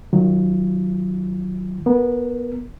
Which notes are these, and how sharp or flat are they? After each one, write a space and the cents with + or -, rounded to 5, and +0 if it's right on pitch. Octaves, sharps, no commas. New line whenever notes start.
D#3 -5 F#3 +0 F4 -35
B3 -20 A#4 +0